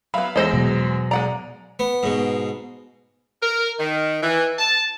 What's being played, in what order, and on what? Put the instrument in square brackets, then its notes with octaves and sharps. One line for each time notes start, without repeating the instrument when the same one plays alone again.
[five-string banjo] F#3 B3 [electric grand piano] E5 F5 B5
[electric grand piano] E2 G#3 A#6 [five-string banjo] A4 C5 D#5
[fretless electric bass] B2 F#3
[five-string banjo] G#3 F#5 A#5 [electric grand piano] D5
[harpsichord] B3
G#2 B2
[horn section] A#4
D#3
E3
A5